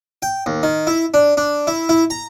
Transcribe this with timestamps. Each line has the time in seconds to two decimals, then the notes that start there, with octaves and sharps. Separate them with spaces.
0.22 G5
0.46 D#2
0.63 D#3
0.87 E4
1.14 D4
1.37 D4
1.67 E4
1.89 E4
2.10 A#5